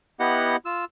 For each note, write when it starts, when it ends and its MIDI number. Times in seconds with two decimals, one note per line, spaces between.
0.20 0.56 59
0.20 0.56 64
0.20 0.56 67
0.20 0.56 75
0.20 0.56 78
0.65 0.85 65
0.65 0.85 88